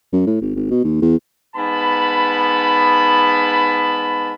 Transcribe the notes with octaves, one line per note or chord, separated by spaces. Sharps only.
F#2
A2
G#1
G#1
B2
D#2
E2
G#2 B3 A5 B5